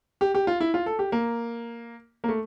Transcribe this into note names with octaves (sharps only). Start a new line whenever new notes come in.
G4
G4
F4
E4
F4
A4
G4
A#3
A#3
A3